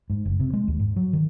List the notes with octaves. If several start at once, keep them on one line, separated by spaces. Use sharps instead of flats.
G#2
F#1
C3
G#3
D#2
G#2
F#3
D#3